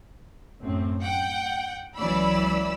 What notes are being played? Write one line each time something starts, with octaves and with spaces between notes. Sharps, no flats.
F#2 A2 C4
F#5 G5
C#2 E3 F#3 D5 B5 E6